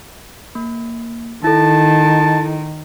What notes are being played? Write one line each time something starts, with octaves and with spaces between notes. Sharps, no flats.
A#3
D#3 E4 A4 A5